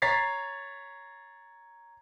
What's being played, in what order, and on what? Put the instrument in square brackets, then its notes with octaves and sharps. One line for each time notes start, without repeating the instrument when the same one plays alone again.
[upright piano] C#5 A#5 A6 B6 C7